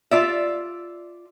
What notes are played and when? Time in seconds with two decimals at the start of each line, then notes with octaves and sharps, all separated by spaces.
0.11 F4 D5 E5